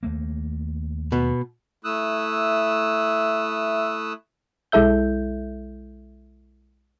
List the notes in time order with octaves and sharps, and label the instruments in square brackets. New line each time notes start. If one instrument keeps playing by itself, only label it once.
[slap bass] D#2 A3 A#3
[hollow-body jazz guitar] B2 B3
[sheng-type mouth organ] A3 E4 D#6 E6 F#6
[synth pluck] B1 G#3 E4 A4 E5 G6